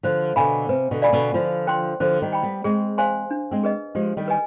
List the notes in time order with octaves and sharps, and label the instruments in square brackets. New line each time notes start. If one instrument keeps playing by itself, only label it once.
[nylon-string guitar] D3 F3 [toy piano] C5
[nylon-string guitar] B2 D3 [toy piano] F5 G#5 B5
[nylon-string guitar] C3 [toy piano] B4
[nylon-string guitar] B2 D3
[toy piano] D5 F5 G#5 B5
[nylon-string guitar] B2 D3
[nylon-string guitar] D3 F3 [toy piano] F4
[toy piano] C5 G5 C6
[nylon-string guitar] D3 F3 [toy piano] C5
[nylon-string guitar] D#3 G3
[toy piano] G5 B5
[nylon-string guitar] G3 B3
[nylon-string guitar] G#3 C4 [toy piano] G#4
[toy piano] C5 F5 G#5 C6
D4
[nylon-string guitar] G#3 C4
[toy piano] G#4 B4 D#5
[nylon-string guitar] F3 G#3 [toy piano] G4
[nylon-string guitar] D#3 G3
[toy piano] B4 D#5 G#5